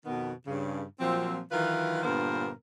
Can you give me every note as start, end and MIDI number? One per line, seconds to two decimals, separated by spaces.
0.05 0.32 41
0.05 0.32 47
0.05 0.32 51
0.05 0.32 59
0.47 0.82 43
0.47 0.82 49
0.99 1.41 46
0.99 1.41 53
0.99 1.41 54
0.99 1.41 60
1.51 2.01 51
1.51 2.01 52
1.51 2.01 54
1.51 2.01 65
1.51 2.01 70
1.51 2.01 71
2.03 2.51 43
2.03 2.51 46
2.03 2.51 50
2.03 2.51 59
2.03 2.51 70
2.03 2.51 72